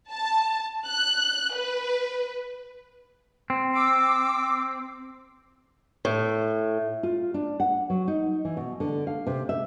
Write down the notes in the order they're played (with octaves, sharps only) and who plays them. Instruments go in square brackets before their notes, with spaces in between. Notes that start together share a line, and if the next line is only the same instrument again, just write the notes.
[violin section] A5
F#6
B4
[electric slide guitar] C4
[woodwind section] D6 E6
[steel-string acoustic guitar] A2
[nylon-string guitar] F4
D4
F#5
F#3
D#4
E3
B2
D3
F5
C3
E5